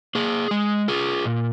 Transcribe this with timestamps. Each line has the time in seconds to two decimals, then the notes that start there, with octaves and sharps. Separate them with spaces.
0.15 A#3 G#4
0.51 G#3
0.88 F4 G#4
1.25 A#2